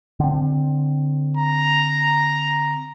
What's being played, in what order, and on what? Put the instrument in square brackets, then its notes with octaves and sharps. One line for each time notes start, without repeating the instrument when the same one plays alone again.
[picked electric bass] D3 C4
[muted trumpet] A#5